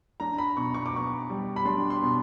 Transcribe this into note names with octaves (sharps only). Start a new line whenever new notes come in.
D4 A#5
B5
B2 C#6
C#6
D6
B3 C#6
G3
B5
D4 C6
C6
B2